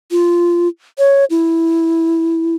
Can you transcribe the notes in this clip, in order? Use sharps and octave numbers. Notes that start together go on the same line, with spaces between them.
F4
C#5
E4